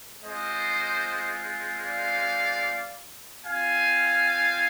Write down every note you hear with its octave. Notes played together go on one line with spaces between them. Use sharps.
G#3 C4 F4 C5 D#5
D5 F5
C4 F4 F5 G#5